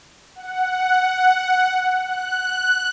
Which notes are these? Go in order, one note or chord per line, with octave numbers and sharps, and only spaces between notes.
F#5
F#6